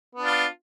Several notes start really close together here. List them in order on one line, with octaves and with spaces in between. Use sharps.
B3 D4 F4